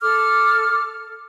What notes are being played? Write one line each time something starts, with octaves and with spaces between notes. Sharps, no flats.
A4 D6 F6